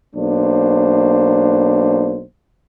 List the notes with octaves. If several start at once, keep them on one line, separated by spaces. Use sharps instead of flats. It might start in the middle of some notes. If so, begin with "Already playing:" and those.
B1 A#3 D4 C5